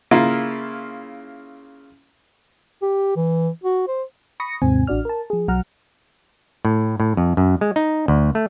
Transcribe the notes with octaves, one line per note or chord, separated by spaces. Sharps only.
C#3 A#3 E4 F4
G4
E3
F#4
C5
B5 C#6 D#6 A#6 C#7
D#2 G#2 C3 C4 G#5
A1 D4 F#4 D5 F6
A#4 A5
F3 G#4
B1 F#3 F#5 A#5 F6
A2
A2
F2
F#2
G#3
D#4
D2
A3